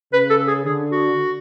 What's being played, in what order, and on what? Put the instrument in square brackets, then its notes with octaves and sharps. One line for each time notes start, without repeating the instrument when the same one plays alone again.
[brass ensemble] C#3 [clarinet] B4
[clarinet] A4
G#4
[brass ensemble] D3 [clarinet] G#4
[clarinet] F#4